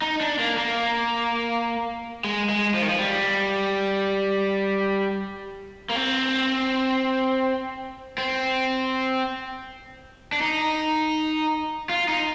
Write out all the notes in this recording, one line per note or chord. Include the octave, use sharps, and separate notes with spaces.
D#4
D4
A#3
A#3
G#3
G#3
F3
D#3
F3
G3
A#3
C4
C4
D4
D#4
F4
D#4